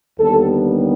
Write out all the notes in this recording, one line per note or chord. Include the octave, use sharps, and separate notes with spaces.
D#2 D3 G3 B3 A4